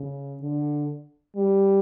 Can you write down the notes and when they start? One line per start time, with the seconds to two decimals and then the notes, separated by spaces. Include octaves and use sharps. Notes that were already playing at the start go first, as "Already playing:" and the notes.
Already playing: C#3
0.42 D3
1.37 G3